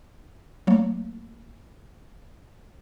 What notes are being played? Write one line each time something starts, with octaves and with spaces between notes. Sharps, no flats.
F#3 A3 A#3